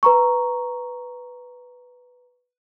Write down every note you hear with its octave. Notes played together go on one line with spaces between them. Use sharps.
B4 A#5 C#6